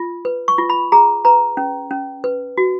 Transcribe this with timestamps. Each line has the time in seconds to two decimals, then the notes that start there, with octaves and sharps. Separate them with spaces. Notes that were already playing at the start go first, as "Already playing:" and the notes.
Already playing: F4
0.25 B4
0.48 C#6
0.58 F4
0.70 B5
0.92 G#4 A#5
1.25 B4 A#5
1.57 C#4
1.91 C#4
2.24 B4
2.58 F#4